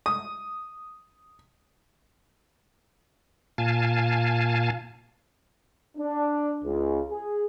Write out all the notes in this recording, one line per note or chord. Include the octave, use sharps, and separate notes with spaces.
D#6
A#2 F5 G#5 A5
D4
C#2
G#4